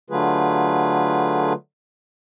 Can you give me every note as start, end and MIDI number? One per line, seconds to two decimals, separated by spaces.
0.10 1.53 50
0.10 1.53 54
0.10 1.53 57
0.10 1.53 65
0.10 1.53 68
0.10 1.53 71